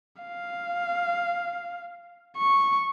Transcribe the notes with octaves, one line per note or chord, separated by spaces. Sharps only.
F5
C#6